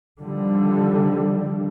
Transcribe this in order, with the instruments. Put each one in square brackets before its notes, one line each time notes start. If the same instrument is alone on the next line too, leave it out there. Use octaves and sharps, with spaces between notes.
[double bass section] D3 D#3 F3 G3